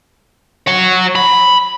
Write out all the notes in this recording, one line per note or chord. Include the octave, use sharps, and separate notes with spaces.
C#5 F#5
B5